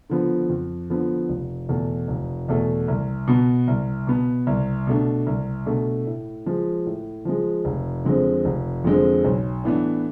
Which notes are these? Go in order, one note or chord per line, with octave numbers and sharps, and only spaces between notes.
D3 F3 B3
F2
D3 F3 B3
F1
E2 B2 A3
F1
E2 B2 A3
C2
B2 B3
C2
B2 B3
C2
B2 A3 D4
C2
B2 A3 D4
A2
F3 G#3
A2
F3 G#3
F1
F2 D3 G#3 C4
F1
F2 D3 G#3 C4
B1
A2 E3 B3 D4